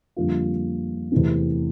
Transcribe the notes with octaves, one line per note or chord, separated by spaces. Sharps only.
F2 D3 G3 A#3 F4
E2 C3 E3 A3 C4